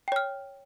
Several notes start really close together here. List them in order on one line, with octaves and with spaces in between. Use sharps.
G5 C#5 F6